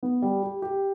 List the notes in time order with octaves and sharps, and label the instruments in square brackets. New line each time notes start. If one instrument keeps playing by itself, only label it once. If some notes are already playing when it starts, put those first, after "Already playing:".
[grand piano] B3
G3
G4
G4